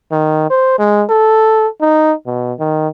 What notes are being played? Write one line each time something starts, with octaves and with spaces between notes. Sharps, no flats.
D#3
C5
G#3
A4
D#4
B2
D#3